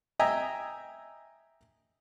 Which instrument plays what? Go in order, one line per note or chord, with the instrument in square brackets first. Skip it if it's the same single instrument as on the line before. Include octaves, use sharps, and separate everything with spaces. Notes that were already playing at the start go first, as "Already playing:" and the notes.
[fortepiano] D#5 E5 G5 G#5 A#5